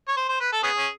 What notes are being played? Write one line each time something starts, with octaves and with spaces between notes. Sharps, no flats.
C#5
C5
C5
B4
A4
B3 C#4 G#4
C#4